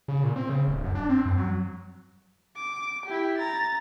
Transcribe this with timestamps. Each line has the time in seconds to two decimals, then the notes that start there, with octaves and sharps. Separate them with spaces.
0.08 C#3
0.24 A#2
0.36 C4
0.49 C#3
0.68 D1
0.84 F#2
0.95 D4
1.09 C4
1.25 F#2
1.38 F#3
2.56 D6
3.06 E4 G4
3.38 A#5 A6